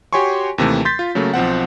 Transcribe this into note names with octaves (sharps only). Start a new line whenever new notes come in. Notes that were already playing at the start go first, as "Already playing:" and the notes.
F#4 G4 C#5 G#5 C6 C#6
D#2 C3 E3 A3
C6 G6 A6 B6
F4
C#3 F#3 A3 A#3
B1 F3 C4 F#5